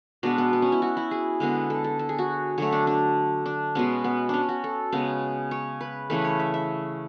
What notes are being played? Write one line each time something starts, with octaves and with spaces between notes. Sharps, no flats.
B2 G#3 B3 D4
B3
B3
C#4
E4
F#4
E4
G#4
D3 G#3 B3
A4
A4
A4
G#4
F#4
D3 F#3 A3 C#5
D4
D4
D4
B2 G#3 B3 C#4
B3
C#4 D4
F#4
A4
C#3 G#3 B3
C#5
B4
C#3 E3 A3 B4
C#5
E5
E5